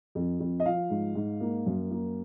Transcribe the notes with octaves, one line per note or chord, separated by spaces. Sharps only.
F2
F2
D#5
F3 F5
G#2
G#2
A#3
F#2
A#3